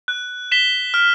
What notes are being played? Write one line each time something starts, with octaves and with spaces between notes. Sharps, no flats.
F#6
B6 E7 G7
F6